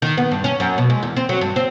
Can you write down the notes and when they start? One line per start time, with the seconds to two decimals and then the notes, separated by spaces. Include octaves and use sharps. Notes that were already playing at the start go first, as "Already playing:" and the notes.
0.02 D#3
0.17 B3
0.32 G2
0.44 C#4
0.60 F#2
0.78 B2
0.90 G#3
1.03 E2
1.16 C4
1.29 F#3
1.41 G2
1.56 C4